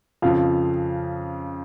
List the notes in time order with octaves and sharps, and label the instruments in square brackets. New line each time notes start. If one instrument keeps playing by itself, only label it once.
[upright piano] F2 C#3 F3 F5